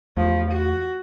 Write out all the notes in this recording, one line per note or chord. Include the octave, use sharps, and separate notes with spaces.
E2 F3 A3
F#4